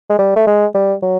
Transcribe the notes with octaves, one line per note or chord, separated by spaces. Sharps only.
G#3
G3
A3
G#3
G3
F#3